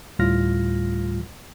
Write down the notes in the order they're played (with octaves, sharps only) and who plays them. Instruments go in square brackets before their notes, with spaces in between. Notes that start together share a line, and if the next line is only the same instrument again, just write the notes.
[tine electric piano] D2 A2 G3 F4 F6 A#6